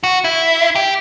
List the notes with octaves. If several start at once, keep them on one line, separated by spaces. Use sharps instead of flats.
F#4
E4
G4